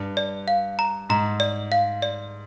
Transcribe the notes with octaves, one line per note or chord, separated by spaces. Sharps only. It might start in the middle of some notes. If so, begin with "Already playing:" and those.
Already playing: G2
D5
F5
A#5
G#2 A#5
D5
F5
D5